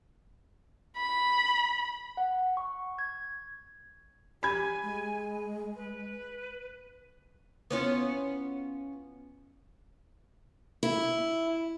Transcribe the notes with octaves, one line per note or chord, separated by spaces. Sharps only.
B5
F#5
C#6
G#6
G4 G#5 B5 G#6
G#3
B4
B3 C#4 F4
E4